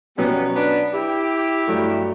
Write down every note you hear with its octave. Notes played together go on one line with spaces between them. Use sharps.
B2 F#3 G3 B3 C#4
B3 D4
E4 G4
G2 F#3 A3